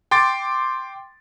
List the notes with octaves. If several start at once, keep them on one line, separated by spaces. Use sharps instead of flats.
G5 C6 D6 A6 D7